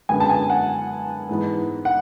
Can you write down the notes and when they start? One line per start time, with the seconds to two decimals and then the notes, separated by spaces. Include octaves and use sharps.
0.09 F#2 D3 G#3 B3 G#5
0.20 A5
0.29 G#5
0.50 F#5
1.29 G#2 E3 G#3 B3
1.85 F#5